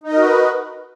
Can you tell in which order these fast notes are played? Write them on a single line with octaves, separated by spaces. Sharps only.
D#4 D#5 A#4 F#4 B4